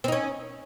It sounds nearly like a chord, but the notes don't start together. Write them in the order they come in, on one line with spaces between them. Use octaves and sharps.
C4 D#4 C#4